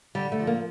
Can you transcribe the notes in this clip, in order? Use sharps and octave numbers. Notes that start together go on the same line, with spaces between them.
D3 G3
A3
F3
A#3